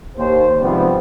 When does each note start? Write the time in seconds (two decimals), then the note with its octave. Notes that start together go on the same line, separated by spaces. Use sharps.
0.17 D#2 C5
0.61 G#2 C3 F3 G3 B3 C4